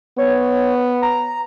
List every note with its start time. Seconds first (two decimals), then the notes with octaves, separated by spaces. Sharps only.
0.18 B3 C#5
1.02 A#5